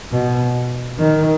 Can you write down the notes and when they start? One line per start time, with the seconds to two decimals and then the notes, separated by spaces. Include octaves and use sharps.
0.12 B2
0.98 D#3